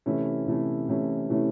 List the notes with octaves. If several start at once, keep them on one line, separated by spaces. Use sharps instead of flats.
C3 E3 A3 C#4 E4
C3 E3 A3 C#4 E4
C3 E3 A3 C#4 E4
C3 E3 A3 C#4 E4